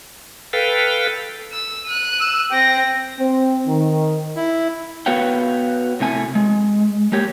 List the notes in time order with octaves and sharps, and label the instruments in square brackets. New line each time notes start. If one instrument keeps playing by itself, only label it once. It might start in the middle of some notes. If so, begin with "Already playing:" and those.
[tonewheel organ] A4 B4 F5 G5
[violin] E6
F#6 D#7
[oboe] E6
[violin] C4 A#6 [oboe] G5
[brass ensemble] C4
D#3
[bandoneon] E4
[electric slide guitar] B3 F#4 B4 C#5 F5 G5
A2 C3 A3 G#5
G#3
G#3 A#3 G4 C#5